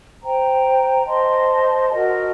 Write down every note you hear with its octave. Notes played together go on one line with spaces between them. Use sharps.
C5 G5 A#5
C5 D#5 A5 C6
F#4 A#4 D#5